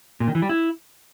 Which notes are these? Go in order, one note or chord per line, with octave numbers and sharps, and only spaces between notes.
A#2
D#3
E3
G3
E4